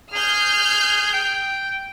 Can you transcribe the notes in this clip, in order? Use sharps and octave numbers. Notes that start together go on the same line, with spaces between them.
G#4 F6 G6
G5